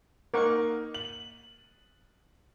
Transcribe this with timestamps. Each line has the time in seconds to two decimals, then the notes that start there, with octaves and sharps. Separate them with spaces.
0.34 A#3 D#4 A#4 F#5 C#6
0.94 F#7